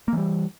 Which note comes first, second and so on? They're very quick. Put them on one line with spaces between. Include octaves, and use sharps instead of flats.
A#3 E3 G3